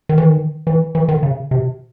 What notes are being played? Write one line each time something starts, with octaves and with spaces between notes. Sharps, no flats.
D#3
E3
D#3
E3
E3
D#3
C#3
C3